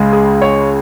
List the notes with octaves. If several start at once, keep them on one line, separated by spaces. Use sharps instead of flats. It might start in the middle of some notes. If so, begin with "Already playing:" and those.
Already playing: C#2 C#3 G#3
G#4
C#5